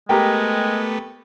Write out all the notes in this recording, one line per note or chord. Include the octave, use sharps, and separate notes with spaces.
G#3 A3 B3 G4 A#4 G5